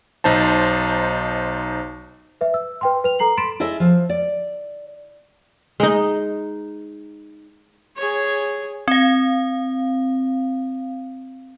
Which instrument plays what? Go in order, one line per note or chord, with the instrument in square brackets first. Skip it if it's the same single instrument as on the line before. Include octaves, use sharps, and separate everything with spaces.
[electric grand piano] B1 D#4 C5 A5
[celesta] B4 E5
E6
B4 G5 C6
B4 F7
A4 A#5 C7 F#7
B5 C6 A6 B6 D7 E7
[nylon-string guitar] E4 G#4 A4 D#5 E5
F3
D5
[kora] G#3 D#4
[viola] G#4 C#5
[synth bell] C4 F5